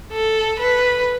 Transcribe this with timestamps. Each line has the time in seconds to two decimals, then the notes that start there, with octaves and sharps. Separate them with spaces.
0.12 A4
0.59 B4